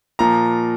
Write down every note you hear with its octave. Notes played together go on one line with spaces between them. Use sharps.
A#2 F3 A#5